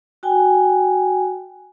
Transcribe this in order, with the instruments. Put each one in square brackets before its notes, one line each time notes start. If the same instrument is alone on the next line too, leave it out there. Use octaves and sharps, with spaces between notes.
[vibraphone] F#4 G5 G#5